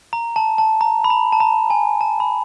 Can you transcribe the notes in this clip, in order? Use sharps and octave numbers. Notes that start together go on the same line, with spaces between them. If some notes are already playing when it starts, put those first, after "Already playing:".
A#5
A5
A5
A#5
B5
A#5
A5
A#5
G#5
A5
B5